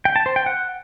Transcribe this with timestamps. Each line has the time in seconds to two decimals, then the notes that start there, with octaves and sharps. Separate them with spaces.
0.05 G5
0.16 A5
0.26 C5
0.36 G5
0.46 F#5